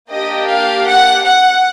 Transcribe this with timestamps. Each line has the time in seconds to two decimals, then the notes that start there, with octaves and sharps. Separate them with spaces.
0.11 A#3 D4 G4 D#5
0.49 F5
0.87 F#5
1.25 F#5